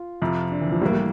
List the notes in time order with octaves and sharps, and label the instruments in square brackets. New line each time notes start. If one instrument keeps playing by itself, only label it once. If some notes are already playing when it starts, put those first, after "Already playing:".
Already playing: [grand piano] F4
[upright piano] F2 C3 F3
[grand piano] D4
E3
F3
[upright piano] A2 E3 A#3 [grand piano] G3
[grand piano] G3